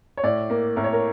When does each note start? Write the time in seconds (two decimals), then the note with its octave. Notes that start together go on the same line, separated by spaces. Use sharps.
0.17 C#5
0.23 A2 D5
0.50 A#3
0.76 A2 A#4
0.84 C#5
0.93 A#4